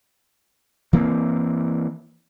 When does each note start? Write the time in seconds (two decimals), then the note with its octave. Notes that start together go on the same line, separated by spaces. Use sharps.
0.93 E3 A#3 C4